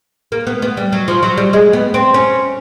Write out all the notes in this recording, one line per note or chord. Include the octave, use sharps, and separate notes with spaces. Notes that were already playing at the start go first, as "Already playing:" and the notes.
A#3
B3
B3
G3
F#3
F3
F#3
G3
G#3
B3
C4
C#4